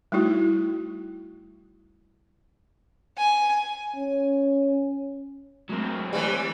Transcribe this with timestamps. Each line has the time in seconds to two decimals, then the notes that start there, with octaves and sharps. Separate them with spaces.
0.12 G3 A3 D#4 E4 F#4
3.17 G#5
3.96 C#4
5.69 F#3 G#3 A3 C4 A#4
6.13 E3 G3